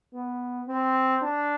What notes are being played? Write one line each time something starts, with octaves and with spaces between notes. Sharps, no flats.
B3
C4
D4